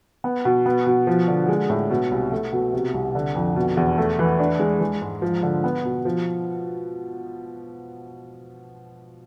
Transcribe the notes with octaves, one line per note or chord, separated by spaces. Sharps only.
B3
B2
B3
B2
F3
D3
G#3
A2
B2
C2
A3
B2
C3
C2
D3
F2
B2
E2
A3
E3
D4
G#3
G#3
G#2
F3
D3
B3
B2
F3